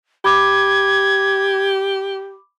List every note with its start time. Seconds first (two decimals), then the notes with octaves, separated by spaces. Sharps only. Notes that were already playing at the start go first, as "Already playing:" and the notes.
0.25 G4 B5 D6 G#6